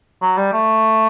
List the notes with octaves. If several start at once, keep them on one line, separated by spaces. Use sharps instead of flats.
F#3
G3
A3